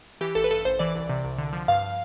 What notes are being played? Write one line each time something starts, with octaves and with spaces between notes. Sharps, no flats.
E3 G4
A1 A4
B4
G2 A4
A1 C5
E3 D5
C2
C3
C2
D3
F3
G2 F5